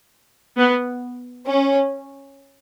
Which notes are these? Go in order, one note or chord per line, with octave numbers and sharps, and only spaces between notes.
B3
C#4